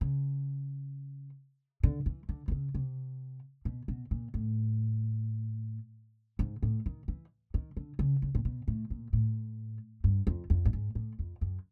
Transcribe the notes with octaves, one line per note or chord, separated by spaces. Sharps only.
C#3
D3
E3
D3
C3
C#3
C3
B2
B2
A#2
A2
G#2
A2
D#3
E3
D#3
D3
C#3
C#3
A#2
B2
A2
A#2
A2
G2
F2
F2
G2
G#2
A2
F2
F#2